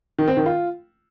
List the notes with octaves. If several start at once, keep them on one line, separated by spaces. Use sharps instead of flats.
D#3
C4
D#3
F4